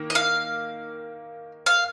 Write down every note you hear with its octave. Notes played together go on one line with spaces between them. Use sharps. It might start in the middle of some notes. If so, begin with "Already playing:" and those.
Already playing: D#3 A#3
D#5
F5
F5